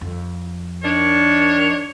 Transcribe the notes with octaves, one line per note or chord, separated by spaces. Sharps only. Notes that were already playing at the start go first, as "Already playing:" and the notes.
F2
D#3 D4 C#5